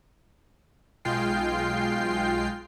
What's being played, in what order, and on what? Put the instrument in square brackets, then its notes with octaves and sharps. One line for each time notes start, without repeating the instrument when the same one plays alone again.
[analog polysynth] B1 G#3 F4 G5 C7